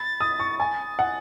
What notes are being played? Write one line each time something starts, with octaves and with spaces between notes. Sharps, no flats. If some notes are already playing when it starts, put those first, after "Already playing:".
Already playing: B5 A6
D#6
C#6
G#5 A6
F#5